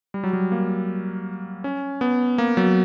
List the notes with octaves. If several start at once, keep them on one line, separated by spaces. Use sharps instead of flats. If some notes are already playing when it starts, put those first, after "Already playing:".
G3
F#3
G3
A#3
C#4
B3
A#3
F#3